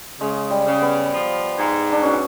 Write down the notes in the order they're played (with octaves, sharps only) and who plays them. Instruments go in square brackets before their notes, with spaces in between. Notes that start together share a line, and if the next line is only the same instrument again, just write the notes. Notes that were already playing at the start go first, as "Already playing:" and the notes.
[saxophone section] C#3 [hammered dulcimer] G#3
[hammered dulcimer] G3
[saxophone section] C#3
[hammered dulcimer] B3
[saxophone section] F3
G#2
[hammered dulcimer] D4
[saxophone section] B2 [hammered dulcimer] C#4